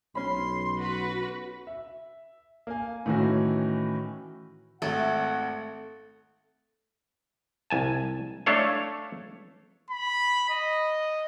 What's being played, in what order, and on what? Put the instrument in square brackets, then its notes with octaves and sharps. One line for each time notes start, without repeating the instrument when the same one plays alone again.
[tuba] B1 [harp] C#4 B5 [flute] C6
[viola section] F#4 B4
[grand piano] E5
A#3 G#5
A2 D#3 E3 C#4 F#4
[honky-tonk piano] G#1 [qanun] A3 [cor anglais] F#5
[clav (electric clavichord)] C2 G#5 A5
A3 D4 A4 C#5 F5
[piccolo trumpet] B5
D#5